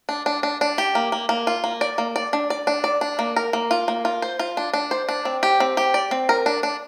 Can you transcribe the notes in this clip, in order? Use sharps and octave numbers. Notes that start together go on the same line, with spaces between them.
D4
D4
D4
D4
G4
A#3
A#3
A#3
F4
A#3
D5
A#3
D5
D4
D5
D4
D5
D4
A#3
A#4
A#3
F4
A#3
F4
C5
F4
D4
D4
C5
D4
C4
G4
C4
G4
D5
C4
A#4
D4
D4